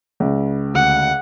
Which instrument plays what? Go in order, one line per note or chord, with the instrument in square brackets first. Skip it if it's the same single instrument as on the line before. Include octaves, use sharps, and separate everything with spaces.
[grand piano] C#2
[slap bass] D2 [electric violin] F#5